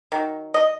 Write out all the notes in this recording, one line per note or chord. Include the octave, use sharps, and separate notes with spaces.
D#3 F#3
D#5